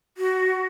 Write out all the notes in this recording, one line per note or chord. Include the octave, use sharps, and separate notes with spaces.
F#4